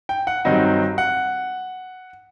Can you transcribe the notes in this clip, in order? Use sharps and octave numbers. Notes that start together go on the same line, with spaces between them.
G5
F#5
G2 D#3 F#3 C4 D#4 D#5
F#5